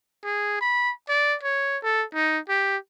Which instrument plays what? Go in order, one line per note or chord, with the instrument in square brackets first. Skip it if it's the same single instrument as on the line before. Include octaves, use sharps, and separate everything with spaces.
[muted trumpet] G#4
B5
D5
C#5
A4
D#4
G4